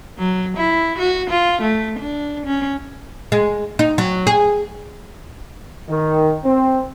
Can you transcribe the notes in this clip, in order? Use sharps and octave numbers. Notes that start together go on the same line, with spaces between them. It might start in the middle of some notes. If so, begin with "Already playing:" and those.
F#3
E4
F#4
F4
A3
D4
C#4
G#3
D#4
F#3
G#4
D#3
C4